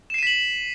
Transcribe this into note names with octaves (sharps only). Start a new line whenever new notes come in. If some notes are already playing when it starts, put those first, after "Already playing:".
B6 C7 D#7 E7 F#7